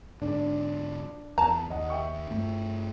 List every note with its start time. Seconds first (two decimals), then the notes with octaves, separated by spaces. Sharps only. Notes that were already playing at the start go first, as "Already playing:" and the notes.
0.22 G#2 D3 D4
1.38 E2 A5 A#5
1.70 D#2 D#5 F#5
1.90 E5 G5 C#6
2.30 G2 A3